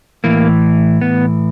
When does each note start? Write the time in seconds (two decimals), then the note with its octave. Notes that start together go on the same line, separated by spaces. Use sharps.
0.24 A2 E3 A#3
1.01 B3